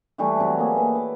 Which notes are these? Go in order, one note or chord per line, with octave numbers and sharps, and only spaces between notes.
E3 G3 A3
C3 F#3 E4
A#3 G#4
B4
D6